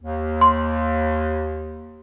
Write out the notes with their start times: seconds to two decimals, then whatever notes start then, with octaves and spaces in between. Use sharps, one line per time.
0.02 D#2
0.41 C6